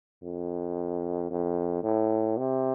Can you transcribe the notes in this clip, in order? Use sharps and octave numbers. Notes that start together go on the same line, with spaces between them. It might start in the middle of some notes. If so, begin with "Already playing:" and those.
F2
F2
A2
C3